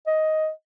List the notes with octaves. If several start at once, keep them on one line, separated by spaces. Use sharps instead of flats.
D#5